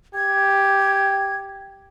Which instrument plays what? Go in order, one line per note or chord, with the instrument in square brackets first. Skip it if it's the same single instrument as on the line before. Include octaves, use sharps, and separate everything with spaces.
[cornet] G4 [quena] G#6